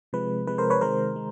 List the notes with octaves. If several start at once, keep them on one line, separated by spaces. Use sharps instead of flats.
C3 F3 G#3 B4
C3 F3 G#3 B4
A#4 C5
B4 C#5
C3 D#3 G#3 A#4 C5
G#3